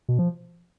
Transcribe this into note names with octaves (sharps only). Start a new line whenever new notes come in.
B2
F3